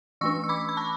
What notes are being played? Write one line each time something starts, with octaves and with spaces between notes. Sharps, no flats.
E3 A3 D4 C#6 E6
E6
B5 D6
B5
A5 C#6